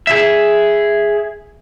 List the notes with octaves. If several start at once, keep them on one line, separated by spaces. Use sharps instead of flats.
G#4 E5